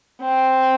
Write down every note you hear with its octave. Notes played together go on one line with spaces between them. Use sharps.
C4